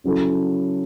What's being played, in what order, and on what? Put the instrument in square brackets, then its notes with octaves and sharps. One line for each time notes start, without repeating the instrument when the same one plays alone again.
[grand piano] C#3 F#3 C#4 E4 A4